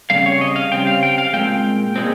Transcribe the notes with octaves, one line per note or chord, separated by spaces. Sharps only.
C#3 G3 C4 F5
C#5
D#5
F5
C#3 G3 C4 G5
F5
G5
F5
A#2 G#3 C4 G5
A#2 G#3 C4